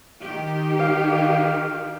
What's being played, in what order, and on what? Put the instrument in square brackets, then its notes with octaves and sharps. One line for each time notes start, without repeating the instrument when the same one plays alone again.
[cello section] D#3 G4
[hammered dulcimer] F5